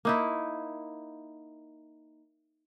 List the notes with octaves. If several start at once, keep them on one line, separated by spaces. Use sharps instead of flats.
A#3 D#4 E4